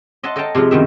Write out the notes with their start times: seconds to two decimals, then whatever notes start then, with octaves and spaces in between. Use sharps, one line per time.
0.23 D#5 E5 F#5 A5 C6
0.36 A4 D#5 F5 G5 A5 A#5
0.55 C3 F3 G#3 F4
0.71 F#2 B2 D#3 E5